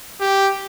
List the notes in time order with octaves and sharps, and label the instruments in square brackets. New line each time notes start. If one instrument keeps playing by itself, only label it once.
[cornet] G4